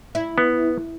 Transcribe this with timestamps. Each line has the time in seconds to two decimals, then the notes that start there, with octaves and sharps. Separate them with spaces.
0.15 E4
0.38 B3